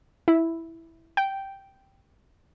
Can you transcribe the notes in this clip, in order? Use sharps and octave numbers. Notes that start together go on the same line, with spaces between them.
E4
G5